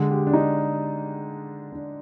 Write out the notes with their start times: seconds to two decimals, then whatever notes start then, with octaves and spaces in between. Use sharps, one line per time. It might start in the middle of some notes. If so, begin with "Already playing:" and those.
Already playing: D3 G#3
0.11 G4
0.27 D4
0.34 D#4
1.72 D4